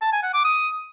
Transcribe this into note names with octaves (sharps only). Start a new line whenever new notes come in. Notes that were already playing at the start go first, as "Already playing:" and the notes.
A5
G#5
F#5
D6
D#6